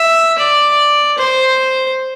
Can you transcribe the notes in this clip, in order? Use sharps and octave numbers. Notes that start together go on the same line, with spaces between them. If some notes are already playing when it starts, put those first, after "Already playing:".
Already playing: E5
D5
C5